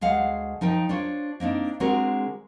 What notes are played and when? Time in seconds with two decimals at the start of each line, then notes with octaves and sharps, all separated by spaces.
0.01 D2 G#3 F5 F#5
0.61 F3 D#4 A#4 G5
0.89 D4 F4 C5 C#5
1.40 A#3 C4 D4 D#4
1.80 D3 G#3 C4 F#4 G#4 A#4